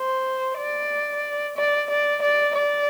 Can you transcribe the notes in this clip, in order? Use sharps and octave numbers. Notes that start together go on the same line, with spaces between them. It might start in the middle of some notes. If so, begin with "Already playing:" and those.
Already playing: C5
D5
D5
D5
D5
D5